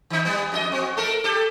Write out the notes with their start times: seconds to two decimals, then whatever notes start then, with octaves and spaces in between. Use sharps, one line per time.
0.10 D#3 D#4
0.25 G3 B3
0.52 F2 F#4 D#5
0.72 C4 F#4
0.97 A3 A4 A#4
1.24 G4 A4